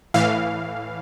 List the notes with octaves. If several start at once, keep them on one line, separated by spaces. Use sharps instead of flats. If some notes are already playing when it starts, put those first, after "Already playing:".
A2 E3 F5